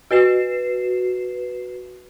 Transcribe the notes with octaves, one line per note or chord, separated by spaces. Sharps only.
F#4 B4 C7 E7